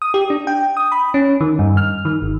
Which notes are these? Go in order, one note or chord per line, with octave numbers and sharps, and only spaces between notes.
D#6
G4
D4
G5
D#6
B5
C#4
D#3
G2
F6
D#3
G1